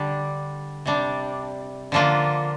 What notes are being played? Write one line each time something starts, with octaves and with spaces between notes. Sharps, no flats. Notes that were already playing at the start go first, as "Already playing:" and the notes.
Already playing: D3 G3 D4
C3 G3 D4
D3 F3 A#3 D4 F4